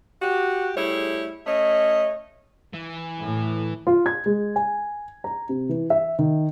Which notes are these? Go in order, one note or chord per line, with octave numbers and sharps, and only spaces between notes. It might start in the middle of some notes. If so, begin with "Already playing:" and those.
F#4 G4
G3 A3 E4 G#4 C#5
A3 C#4 C#5 D#5
E3
A2
F4
G#6
G#3
G#5
A#5
C3
E3
E5
D#3